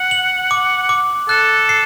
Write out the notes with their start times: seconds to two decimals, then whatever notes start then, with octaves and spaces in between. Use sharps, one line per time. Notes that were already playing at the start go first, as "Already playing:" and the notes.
Already playing: F#5
0.11 F#7
0.51 D6
0.89 D6
1.29 A4 F#6
1.69 C7